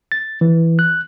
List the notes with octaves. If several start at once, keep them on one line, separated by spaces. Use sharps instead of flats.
A6
E3
F#6